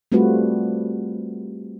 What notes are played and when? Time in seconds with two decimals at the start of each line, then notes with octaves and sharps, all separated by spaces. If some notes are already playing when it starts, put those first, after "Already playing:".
0.12 G3 A3 C4 F4 F#4 B4